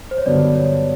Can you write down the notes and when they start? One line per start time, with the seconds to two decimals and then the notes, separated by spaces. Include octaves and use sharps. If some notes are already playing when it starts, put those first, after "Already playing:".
0.11 C5
0.18 C#5
0.26 G2 D3 F#3 B3 D5
0.56 C#5